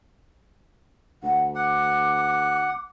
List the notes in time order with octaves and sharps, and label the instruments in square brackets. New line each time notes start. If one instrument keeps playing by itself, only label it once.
[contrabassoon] D2 [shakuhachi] F#5
[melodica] F#5 [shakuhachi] D6